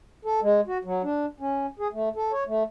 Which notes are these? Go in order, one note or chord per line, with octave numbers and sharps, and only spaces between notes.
A4
G#3
F#4
F#3
D4
C#4
G#4
A3
A4
C#5
A3